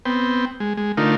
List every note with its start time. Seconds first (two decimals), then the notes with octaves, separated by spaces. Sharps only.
0.05 B3 C4 G5
0.60 G#3
0.77 G#3
0.97 D3 A3 D#4 F4 A#4